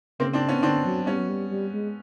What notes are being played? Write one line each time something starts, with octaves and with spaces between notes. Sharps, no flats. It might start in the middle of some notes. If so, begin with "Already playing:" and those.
C#3 A#3 C4
C4 D4
B3 C#4
D3 C4 D4
F#3
G3 B3 C#4
F#3
G3
G3
G#3